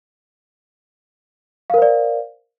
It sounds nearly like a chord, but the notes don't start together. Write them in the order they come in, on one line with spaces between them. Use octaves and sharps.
F5 A#4 C5 D5